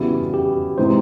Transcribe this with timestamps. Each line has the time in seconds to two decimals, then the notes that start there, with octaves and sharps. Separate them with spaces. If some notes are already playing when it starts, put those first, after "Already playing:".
Already playing: C#3 E3 G3 B3 E4 F#4
0.34 G4
0.78 C3 E3 G#3 C4 D#4 C5